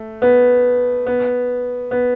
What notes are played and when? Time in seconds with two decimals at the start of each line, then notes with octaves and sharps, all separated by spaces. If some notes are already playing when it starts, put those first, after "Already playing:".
Already playing: A3
0.22 B3
1.06 B3
1.91 B3